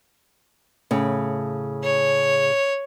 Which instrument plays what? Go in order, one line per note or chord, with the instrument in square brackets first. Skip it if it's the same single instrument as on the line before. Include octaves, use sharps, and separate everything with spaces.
[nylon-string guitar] A2 C#3
[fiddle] C#5